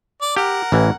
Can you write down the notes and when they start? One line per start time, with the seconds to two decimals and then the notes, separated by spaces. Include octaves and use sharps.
0.21 D5
0.36 G4 A#4 F#5
0.72 A1 E3